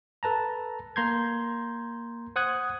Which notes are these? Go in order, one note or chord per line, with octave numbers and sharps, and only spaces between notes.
A4 B4 A5 A#5
A#3 A#5 C6 G6 G#6
C5 F#5 D#6 F#6 G#6